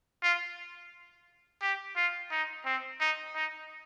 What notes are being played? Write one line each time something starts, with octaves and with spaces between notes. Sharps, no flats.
F4
G4
F4
D#4
C4
D#4
D#4